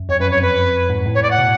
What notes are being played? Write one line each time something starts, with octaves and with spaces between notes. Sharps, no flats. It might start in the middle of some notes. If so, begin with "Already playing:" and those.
Already playing: F#2
F2 C#5
F#2 B4
C#5
F2 B4
G#2
A2
C#5
D5
F#5
B2